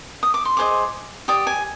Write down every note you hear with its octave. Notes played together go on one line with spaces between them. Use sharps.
D#6
D6
C6
G#4 C5 D#5 D6
G4 D5 D#6
G#5